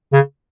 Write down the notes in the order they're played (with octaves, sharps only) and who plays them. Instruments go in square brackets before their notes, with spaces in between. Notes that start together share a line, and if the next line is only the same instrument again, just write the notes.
[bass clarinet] C#3